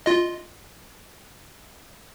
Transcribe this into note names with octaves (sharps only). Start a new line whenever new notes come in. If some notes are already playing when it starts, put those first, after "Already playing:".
F4 D#5